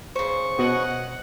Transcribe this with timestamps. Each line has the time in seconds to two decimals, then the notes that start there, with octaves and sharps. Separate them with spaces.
0.16 C#3 C5 C#6
0.59 B2 F#4 C#5 D#5 F#5